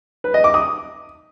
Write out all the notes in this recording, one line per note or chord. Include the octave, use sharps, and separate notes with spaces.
B4
D#5
D6
D#6